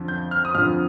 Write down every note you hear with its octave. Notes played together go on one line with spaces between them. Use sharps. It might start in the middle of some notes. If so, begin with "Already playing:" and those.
Already playing: F2 D3 F3
G6
F6
D#6
F2 D3 F3 F6